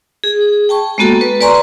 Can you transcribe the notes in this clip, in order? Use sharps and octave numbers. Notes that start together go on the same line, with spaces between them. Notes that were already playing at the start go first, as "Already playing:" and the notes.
G#4
G5 A5 C#6
G#3 A#3 B3 F#4 A4
B4
B4 D5 G#5 A#5 C6 C#6